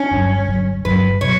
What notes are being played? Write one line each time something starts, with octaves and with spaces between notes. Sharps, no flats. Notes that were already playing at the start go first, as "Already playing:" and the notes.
Already playing: C#4
G1 G2 F#3
G1 G2 F#3
G1 G2 F#3 B4
B2 F#3 C#5